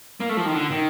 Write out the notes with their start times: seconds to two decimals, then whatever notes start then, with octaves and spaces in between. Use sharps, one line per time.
0.20 A#3
0.29 A3
0.37 F3
0.45 D#3
0.54 D3
0.71 D#3